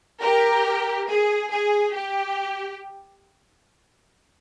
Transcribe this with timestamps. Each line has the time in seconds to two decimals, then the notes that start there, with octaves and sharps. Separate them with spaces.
0.22 G4 A#4
1.09 G#4
1.52 G#4
1.95 G4